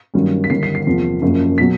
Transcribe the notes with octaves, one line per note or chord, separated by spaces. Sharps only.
G2 D#3 F#3 A#3 C#4
B6
G1 G2 D#3 C7
C7
C7
E2 C3 F3 A#3
F#1 F#2 C#3 F3
B2 F#3 B6